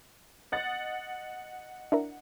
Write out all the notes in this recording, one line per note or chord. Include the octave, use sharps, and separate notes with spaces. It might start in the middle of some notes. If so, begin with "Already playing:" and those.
D#5 F#5 A6
D4 E4 A#4